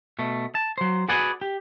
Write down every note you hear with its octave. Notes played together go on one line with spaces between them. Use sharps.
B2 A3
A5
F#3 C5
F#4 G#4 B4 D5 F#5 G#5
G4